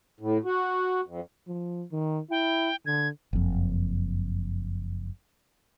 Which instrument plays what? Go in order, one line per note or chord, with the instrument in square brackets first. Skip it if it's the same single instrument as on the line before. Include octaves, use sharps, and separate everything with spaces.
[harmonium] A2
F#4
F2
[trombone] F3
D#3
[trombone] E4 [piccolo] G5
[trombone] D3 [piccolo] G#6
[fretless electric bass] F#1 F2